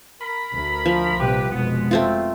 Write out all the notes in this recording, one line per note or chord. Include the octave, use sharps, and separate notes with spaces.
A#4 B5
D2
F3
A#1 C3 G3 G4 B4
F1 B2 G#3 B3
A3 C4 F4